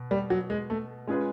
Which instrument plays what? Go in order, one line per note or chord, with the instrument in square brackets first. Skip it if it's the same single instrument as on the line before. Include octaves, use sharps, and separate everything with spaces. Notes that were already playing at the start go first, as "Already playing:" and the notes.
Already playing: [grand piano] B2
[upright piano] G3
F#3
G#3
A3
[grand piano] G#3 C#4 F4 G#4 B4